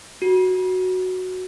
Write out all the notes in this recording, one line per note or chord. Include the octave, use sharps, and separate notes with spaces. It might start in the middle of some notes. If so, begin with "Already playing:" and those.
F#4